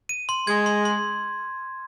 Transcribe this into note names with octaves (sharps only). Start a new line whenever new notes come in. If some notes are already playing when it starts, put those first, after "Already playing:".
D#7
C6
G#3 G#6
C6
C6